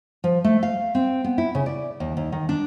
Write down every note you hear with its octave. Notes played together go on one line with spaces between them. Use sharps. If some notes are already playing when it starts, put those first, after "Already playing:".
F3
A3
F5
C4
B3
E4
C#3
D5
D#2
D#2
D#3
D4